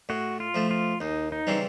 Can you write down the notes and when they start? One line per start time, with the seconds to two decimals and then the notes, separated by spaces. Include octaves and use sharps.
0.09 A2 F#4
0.40 F4
0.54 F3 A3
0.71 F4
1.01 D#2 D#4
1.32 D#4
1.47 C#3 E3 G3 C4